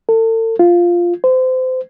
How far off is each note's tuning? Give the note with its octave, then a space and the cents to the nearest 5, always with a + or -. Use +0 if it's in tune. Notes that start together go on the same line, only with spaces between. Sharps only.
A4 +40
F4 -5
C5 -30